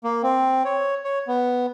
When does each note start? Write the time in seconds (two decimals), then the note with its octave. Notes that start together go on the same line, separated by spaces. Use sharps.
0.04 A#3
0.23 C4
0.65 C#5
1.04 C#5
1.28 B3